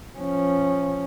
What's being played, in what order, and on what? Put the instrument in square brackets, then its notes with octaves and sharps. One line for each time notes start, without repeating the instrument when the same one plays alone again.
[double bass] F3 C#4